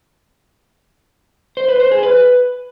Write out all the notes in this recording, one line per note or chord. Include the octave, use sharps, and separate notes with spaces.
C5
B4
C5
G#4
B4